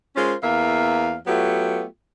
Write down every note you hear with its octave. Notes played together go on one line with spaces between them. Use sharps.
G#3 C#4 F4 A#4 C5
E2 A#3 E5 F5
F#3 A3 B3 F4 G4